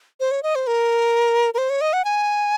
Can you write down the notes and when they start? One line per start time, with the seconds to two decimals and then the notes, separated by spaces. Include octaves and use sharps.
0.20 C5
0.31 C#5
0.43 D#5
0.55 C5
0.67 A#4
1.54 A#4
1.58 C5
1.70 C#5
1.81 D#5
1.93 F#5
2.05 G#5